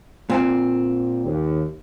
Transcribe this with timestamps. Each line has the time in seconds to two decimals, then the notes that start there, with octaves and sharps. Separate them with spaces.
0.30 A#2 C4
1.24 D#2